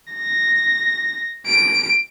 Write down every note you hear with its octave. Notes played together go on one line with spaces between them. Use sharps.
A#6
D7